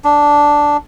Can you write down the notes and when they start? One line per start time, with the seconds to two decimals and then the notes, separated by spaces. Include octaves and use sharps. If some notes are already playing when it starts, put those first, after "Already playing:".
0.04 D4